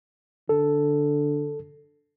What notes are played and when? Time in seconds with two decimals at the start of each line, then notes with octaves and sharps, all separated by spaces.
0.49 D3 A4